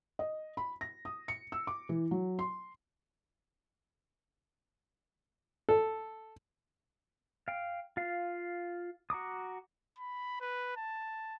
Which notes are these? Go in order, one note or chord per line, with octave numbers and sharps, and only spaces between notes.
D#5
B5
A#6
D#6
C#7
E6
D6
E3
F#3
C6
A4
F5 G5
F4 F5
F#4 A#5 D6 D#6
B5
B4
A5